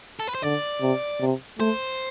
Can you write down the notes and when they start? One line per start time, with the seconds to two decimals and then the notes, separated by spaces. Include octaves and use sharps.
0.20 A4
0.27 B4
0.35 C5
0.42 D3 D5
0.81 C3
1.21 C3
1.59 A3 C5